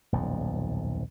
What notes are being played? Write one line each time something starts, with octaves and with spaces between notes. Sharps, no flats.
D#1 B1 F2